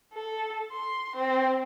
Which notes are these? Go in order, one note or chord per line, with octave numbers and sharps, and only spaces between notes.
A4
C6
C4